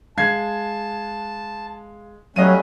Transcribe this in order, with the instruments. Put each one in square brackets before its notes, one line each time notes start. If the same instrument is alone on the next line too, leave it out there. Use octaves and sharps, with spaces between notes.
[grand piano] G#3 G#6 C7 [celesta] F5 [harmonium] A5
[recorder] F#3 [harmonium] G3 A3 C#4 [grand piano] D#5 F5 D#7